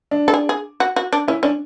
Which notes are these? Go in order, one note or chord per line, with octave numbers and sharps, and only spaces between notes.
D4
A4
G#4
G#4
F#4
F#4
D4
C#4 E4
C#4 D4